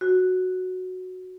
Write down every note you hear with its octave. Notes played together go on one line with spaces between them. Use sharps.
F#4